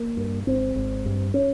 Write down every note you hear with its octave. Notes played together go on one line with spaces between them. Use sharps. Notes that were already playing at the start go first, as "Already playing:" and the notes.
Already playing: A#3
G2
G#1 C4
G#1
G2
C#4